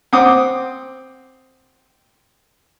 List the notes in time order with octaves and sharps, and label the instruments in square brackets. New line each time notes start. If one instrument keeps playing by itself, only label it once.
[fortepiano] C4 C5 F#5 D6 D#6